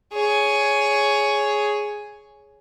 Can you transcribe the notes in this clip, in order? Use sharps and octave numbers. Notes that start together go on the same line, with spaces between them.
G#4 C#5